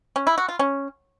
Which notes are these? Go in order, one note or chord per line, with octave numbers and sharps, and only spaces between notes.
C#4
E4
F#4
F4
C#4